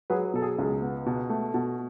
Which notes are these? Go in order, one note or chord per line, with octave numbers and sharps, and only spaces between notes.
F#3 G#4 B4
B2 A4
G#4
C#2 G#4
B3
B2
A3
B2